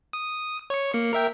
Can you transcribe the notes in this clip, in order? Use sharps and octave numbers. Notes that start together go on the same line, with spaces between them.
D#6
C#5 C#6
A#3 C#7
A#4 E5 G5